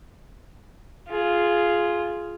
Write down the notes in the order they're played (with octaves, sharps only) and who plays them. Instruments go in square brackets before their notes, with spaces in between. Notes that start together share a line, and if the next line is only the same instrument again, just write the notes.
[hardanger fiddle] F4 G#4